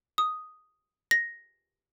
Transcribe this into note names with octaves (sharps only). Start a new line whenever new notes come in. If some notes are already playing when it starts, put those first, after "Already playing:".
D#6
A#6